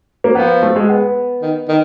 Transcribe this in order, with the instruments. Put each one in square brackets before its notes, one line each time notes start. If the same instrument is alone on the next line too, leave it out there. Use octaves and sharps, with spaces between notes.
[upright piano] A#3
[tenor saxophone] F3 [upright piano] B3
[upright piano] A3
G#3
B3
[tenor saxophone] D#3
D#3